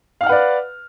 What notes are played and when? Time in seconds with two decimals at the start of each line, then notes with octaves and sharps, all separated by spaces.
0.21 F5
0.23 F6
0.26 F#5
0.29 B4
0.32 D5